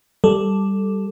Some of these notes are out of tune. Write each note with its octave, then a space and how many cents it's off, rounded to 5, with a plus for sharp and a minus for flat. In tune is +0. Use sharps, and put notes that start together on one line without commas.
G3 +0 A4 +0